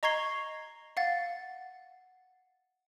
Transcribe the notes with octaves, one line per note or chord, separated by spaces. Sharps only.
D#5 A#5 C#6 G#6 C7 G7
F5 F#5 A6